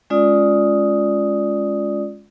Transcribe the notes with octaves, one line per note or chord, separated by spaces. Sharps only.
G#3 C#4 F4 D5 D#6